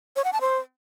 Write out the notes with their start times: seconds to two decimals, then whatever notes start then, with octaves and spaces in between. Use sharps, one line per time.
0.16 C#5
0.24 F#5
0.33 A5
0.41 C5